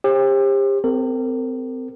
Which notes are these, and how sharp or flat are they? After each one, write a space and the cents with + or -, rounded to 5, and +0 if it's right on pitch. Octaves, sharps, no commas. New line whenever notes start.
G4 +30 C5 +40
C4 -25 A#4 -40